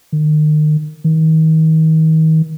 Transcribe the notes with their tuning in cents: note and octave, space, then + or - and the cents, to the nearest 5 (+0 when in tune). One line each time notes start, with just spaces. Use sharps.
D#3 -35
D#3 +35